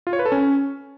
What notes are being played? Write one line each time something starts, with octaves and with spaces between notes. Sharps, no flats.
F4
C#5
B4
A4
C#4